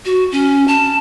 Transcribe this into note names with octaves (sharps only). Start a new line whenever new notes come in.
F#4
C#4
A5